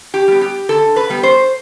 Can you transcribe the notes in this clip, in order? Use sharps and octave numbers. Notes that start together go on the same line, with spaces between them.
G4
G3 B3
G4
D3 A4
B4
G3 B3
C5